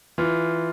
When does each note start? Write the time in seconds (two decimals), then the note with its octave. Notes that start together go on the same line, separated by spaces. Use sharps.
0.18 E3 F4